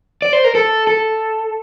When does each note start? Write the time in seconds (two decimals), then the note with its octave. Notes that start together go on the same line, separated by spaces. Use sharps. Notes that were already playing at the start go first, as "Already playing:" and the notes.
0.22 D5
0.33 C5
0.44 A#4
0.55 A4
0.87 A4